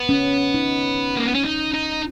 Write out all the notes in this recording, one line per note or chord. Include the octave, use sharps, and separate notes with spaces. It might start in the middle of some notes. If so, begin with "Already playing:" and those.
Already playing: B3
C#4
D#4
A#3
B3
C#4
D#4
D#4